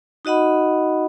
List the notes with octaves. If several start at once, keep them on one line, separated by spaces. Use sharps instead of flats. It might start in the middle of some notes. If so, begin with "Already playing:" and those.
D#4 F#4 D#5 F#5 B5